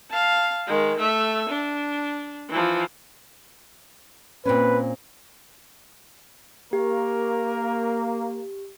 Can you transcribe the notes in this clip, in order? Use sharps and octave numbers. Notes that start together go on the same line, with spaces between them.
F5 A5
D#3 G#3
A3 E5
D4
E3 F3
A#2 C4 C#4 B4
A#3 G4 A#4